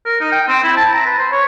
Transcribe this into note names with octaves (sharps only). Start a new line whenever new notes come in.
A#4
D#4
G5
C4
E4
A5
A#5
B4
C5
C#5